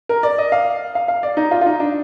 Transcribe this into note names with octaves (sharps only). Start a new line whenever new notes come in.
A#4
D5
D#5
F5
F5
F5
D5
D#4
F4
F4
D#4
D4